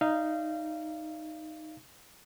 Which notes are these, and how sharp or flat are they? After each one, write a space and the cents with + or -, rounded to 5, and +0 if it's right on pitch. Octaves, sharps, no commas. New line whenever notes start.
D#4 +0 D5 +0 F5 -25